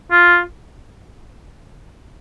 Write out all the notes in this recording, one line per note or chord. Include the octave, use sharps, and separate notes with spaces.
F4